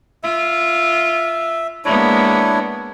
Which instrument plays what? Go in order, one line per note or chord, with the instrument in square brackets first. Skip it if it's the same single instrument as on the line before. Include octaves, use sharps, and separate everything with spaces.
[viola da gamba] F4 [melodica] E5
[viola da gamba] G#3 A#3 B3 [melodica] D4 E4 C#5